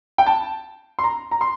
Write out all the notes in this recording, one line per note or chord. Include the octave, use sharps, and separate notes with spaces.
G5
A5
C6
A#5
A#5
C6